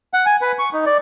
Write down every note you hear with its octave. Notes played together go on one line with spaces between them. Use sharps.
F#5
G#5
B4
C#6
D#4
D5